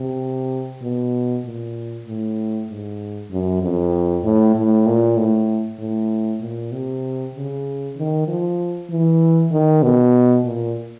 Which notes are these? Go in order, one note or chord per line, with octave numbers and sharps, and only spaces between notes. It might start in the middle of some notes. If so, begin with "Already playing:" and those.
Already playing: C3
B2
A#2
A2
G#2
F#2
F2
A2
A2
A#2
A2
A2
A#2
C3
C#3
D#3
F3
E3
D#3
B2
A#2